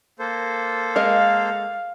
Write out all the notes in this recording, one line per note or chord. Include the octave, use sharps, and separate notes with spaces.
A#3 A4 C5
G#3 A#4 D#5 F5